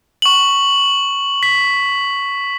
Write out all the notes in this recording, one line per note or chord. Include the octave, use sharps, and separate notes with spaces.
C#6 F#7
B6